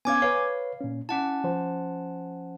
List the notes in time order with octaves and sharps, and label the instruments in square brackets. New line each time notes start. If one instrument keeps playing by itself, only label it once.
[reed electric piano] B3 C#4 F5 [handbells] G#5 D6 G#6
[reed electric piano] B4 C#5 [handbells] F5
[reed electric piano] A#2 C#4
[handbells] C#4 F#5 A5 [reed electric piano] E4
[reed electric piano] F3 C5